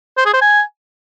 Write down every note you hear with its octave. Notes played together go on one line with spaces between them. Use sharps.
C5
G#4
C5
G#5